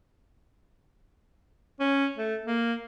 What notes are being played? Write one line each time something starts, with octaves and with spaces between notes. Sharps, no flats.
C#4
A3
A#3